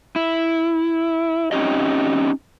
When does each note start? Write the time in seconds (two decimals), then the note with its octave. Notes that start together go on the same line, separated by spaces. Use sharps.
0.16 E4
1.52 C4 C#4 D#4 G4 D#5